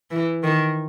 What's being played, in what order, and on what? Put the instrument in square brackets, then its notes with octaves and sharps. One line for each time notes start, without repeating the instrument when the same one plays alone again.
[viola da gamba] E3
D#3